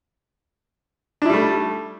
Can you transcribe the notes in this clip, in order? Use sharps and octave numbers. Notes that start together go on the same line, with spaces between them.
G3 A3 D4 E4